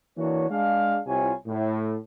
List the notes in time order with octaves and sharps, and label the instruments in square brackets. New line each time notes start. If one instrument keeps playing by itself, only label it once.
[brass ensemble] E3 A#3 D4 F#4 C#5
G#3 D4 F5
C2 C3 E4 F4 C#5 G#5
A2